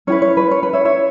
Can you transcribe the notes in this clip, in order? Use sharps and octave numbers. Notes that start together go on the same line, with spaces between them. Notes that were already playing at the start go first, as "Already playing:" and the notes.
C#4 E4 G#4 B4 C#5
C#5
B4
C#5
B4
C#5 E5
C#5 E5